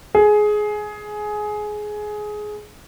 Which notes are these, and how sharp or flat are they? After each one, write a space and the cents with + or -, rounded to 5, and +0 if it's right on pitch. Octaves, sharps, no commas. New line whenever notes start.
G#4 +15